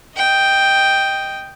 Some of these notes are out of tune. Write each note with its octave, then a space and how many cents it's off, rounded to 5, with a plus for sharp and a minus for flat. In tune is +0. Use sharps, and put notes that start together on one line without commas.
D#5 +0 G5 +0